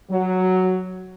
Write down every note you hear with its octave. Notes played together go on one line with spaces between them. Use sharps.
F#3